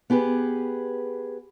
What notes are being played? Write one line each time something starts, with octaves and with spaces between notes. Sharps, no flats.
B3 G4 G#4 B4